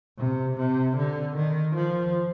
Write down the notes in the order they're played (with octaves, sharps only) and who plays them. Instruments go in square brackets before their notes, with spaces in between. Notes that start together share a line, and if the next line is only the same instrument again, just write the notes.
[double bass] C3
C3
D3
D#3
F3